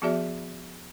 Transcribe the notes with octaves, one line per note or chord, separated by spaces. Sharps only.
F3 B3 F#4 G#4 D5 E5